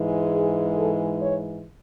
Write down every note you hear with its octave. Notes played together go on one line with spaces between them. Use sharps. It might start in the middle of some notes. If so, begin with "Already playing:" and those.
Already playing: G#2 E3 G#3
G#4
A4
C#5